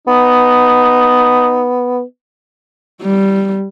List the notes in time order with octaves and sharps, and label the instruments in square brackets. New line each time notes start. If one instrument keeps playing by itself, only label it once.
[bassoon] B3 [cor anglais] D#4
[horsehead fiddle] G3